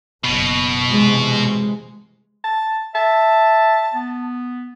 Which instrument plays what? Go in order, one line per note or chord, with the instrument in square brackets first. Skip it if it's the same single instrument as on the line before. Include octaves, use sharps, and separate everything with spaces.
[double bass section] F#1 [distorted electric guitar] B2
[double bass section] C3 E3 G#3
[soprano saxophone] A5
[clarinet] E5 [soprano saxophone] A5
[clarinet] B3